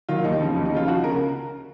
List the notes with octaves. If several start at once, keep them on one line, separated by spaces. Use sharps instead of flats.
D#3 F#3 F4
D#2 D#4
C#3 F3
D#2
D#4
C#3 F3 F4
C#2 F#4
C#3 A#4